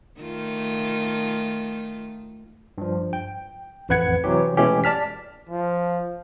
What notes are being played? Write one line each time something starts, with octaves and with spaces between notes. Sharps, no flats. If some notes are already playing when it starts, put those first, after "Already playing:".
D#3 A3 F4
G2 F3
G5
A1 F2 B4 F#5 G#6 C#7
C3 E3 F#3 G4
B2 E3 G#3 A3 C#4 G4
D5 A5 F6 B6
F3